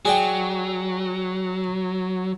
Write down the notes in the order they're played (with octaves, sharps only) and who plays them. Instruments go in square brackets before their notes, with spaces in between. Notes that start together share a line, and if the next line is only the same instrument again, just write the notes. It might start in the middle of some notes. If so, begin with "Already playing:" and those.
[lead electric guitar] F#3 [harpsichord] G#4 D5 G5